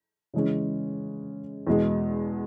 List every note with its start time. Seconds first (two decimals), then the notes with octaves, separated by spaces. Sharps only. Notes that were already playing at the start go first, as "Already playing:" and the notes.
0.34 C#3 E3 G#3 C#4
1.67 E2 B2 G#3